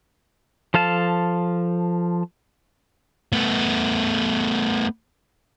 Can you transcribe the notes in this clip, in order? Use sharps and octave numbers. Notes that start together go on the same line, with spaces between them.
F3 A4 F5 A5
A3 B3